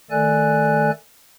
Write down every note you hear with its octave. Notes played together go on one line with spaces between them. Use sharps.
D#3 A3 A4 D5 G#5 F#6